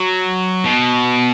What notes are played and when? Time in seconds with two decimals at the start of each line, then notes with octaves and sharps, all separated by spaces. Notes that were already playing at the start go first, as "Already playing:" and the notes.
Already playing: F#3
0.65 B2